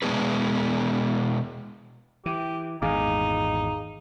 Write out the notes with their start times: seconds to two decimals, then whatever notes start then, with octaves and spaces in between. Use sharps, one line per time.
0.02 B2 G#3 B3 D4 G#4 B4
2.26 E3 G4
2.82 G#1 E2 A#2 D#4 G#4 F5 D6